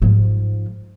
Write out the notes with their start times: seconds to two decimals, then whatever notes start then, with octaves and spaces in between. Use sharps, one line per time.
0.02 G#2 F3